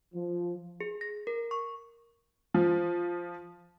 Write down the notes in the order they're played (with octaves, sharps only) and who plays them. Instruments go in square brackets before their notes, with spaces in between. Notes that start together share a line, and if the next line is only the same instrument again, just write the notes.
[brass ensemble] F3
[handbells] G#4
A#6
A#4
C#6
[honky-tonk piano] F3